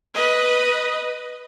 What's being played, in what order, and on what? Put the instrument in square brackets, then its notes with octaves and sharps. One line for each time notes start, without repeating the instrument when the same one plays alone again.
[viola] B4 D#5